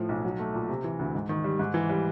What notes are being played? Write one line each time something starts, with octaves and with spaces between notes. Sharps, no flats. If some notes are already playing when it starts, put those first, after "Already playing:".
Already playing: A2 F3
B1
F#3
A3
A#2
C3
E3
D2
G#2
D#3
G3
G#2
E3
G3